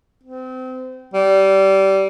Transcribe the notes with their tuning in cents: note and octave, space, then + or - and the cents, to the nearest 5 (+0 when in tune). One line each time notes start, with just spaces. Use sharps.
C4 -30
G3 -20